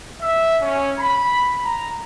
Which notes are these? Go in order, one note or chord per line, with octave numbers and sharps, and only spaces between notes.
E5
C#4
B5
A#5